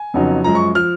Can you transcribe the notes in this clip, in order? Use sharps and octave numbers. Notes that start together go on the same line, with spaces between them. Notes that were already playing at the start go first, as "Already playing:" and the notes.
Already playing: G#5
F2 C#3 F#3 B3 D#4
F#2 F3 G#3 A#5
C#6
F3 F6